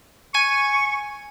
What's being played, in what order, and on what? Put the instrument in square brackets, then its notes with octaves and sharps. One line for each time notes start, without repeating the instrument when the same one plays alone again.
[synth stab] G#5 D#7 [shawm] C#6